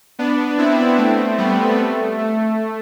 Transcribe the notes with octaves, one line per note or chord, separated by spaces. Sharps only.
B3 D4
C4 E4
A3 C4
G3 B3
A3
A3